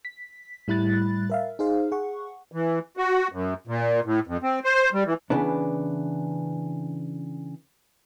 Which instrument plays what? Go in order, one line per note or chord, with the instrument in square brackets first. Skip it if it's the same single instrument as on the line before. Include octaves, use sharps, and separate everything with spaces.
[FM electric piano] B6
A2 G3 E4 B5 F#6 A6
A#4 E5 F5
D#4 G#4 C5 F5
G#4 F#5 C#6
[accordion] E3
F#4
F#2
A#2
A2
F2
C4
C5
G3
E3
[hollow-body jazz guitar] C#3 E3 B3 D4